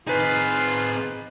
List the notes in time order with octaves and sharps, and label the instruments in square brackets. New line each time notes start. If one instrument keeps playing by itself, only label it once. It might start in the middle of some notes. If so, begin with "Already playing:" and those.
[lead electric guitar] C4 G#4 [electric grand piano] D#4 B4 [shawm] F4